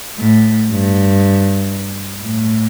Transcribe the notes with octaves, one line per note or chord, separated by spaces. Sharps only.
A2
G2
A2